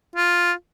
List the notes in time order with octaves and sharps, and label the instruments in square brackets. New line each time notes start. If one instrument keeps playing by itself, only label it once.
[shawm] F4